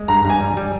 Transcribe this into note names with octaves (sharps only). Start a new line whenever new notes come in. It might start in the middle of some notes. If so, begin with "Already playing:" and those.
Already playing: G#3
G2 A#5
G2 G#5
G3
G3